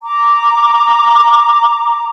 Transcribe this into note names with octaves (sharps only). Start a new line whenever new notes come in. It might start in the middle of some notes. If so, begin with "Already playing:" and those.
A#5 D6